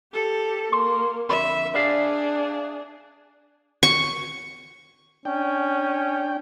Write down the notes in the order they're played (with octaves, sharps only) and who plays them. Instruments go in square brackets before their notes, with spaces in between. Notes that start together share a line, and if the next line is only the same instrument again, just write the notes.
[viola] G4 A4
[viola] A#3 [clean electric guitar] C6
[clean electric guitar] F2 D3 B5 [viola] E5
[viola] D4 G#4 [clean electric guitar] D5 E5 F5
[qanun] C#6
[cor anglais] C#4 [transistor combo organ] D4 G5